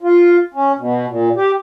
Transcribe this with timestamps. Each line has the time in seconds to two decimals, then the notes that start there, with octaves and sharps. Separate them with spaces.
0.01 F4
0.54 C#4
0.78 B2
1.08 A#2
1.36 G4